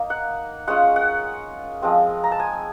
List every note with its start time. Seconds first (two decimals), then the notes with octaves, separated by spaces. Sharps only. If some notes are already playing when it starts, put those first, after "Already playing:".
Already playing: A#3 D#4
0.10 F#5
0.68 G#3 C#4 F4 F#5
0.96 F#5
1.82 F3 G#3 C4
2.24 A#5
2.32 A5
2.40 G#5